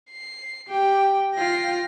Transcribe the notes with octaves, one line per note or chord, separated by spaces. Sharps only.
C7
G4 G5
F4 G5 A#6 C7